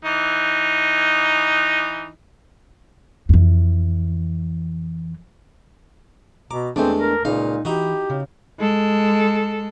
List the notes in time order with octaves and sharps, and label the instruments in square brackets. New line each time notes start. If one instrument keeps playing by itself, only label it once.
[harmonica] E3 D#4
[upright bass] F2 E3
[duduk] B2 [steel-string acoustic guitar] A#5 [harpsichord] D6
[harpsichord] E2 G#3 A3 [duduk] C4 [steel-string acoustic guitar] D4
[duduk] A#4
[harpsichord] C#2 F5 [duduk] A#2 [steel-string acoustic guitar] D#4
[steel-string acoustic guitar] E3 [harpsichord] D#4 F#4 [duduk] G4
[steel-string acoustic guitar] C#3
[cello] G#3 A4